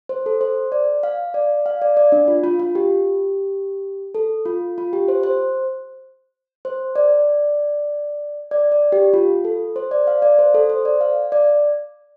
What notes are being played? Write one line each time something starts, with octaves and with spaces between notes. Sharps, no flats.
C5
A4
C5
D5
F5
D5
F5
D5
D5
D4
F4
F4
F4
G4
A4
F4
F4
G4
C5
C5
C5
D5
D5
D5
G4
F4
A4
C5
D5
F5
D5
C5
A4
C5
D5
F5
D5